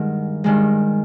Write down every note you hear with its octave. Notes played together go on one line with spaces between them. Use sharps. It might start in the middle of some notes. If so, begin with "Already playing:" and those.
Already playing: G2 D#3 G#3 F#5
G2 D#3 G#3